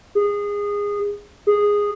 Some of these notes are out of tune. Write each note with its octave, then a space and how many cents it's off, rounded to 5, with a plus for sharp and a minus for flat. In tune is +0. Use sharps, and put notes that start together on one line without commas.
G#4 -20
G#4 -10